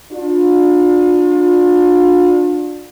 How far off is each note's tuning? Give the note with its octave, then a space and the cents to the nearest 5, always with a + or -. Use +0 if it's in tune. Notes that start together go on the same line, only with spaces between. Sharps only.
D4 +15 F4 +40